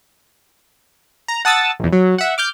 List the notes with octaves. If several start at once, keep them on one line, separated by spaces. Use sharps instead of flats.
A#5
F#5 A5 D#6 E6 A6
A#1 E2
F#3
E5 F#5
D6 F6 G6